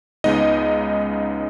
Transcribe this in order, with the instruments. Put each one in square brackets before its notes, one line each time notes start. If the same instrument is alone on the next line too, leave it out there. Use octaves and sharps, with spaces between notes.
[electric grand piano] C#2 C#3 G#3 B3 D#4 D#5